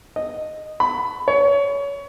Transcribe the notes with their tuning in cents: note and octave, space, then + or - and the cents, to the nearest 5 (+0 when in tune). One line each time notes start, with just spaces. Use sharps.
D#5 -10
B5 +15
C#5 +25